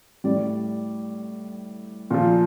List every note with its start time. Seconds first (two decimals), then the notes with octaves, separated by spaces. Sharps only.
0.24 A2 G3 D5
2.11 A#2 F3